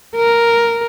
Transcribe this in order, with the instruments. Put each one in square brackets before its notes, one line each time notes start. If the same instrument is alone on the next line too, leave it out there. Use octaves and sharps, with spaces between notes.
[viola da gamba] A#4